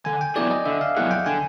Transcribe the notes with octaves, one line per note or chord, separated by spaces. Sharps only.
D3 G#5
G5
F#3 B3 E4 G#4 D5
D#5
D3 E5
F5
F#3 B3 E4 G#4 F#5
G5
D3 G#5